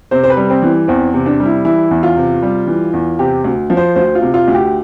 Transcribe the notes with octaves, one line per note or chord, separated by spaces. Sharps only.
C3 C5
C5
B4
G3
C4
E3
E2 C4
C3
D4
G3
E4
E3 E4
E2
F4
C3
G3
E3
E2
C3 G4
D2
F3
C5
D2 C5
F4
C3
F4
D2
G4